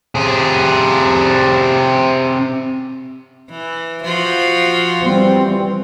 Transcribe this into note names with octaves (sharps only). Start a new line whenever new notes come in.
C3 G#4
E3
F3 F4 F#4
E3 G3 C4